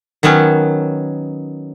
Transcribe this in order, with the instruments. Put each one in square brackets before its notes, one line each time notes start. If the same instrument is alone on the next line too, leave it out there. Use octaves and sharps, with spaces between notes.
[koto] D#3 F#3 B3 C#4